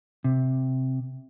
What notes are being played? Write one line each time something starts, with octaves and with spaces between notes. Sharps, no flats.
C3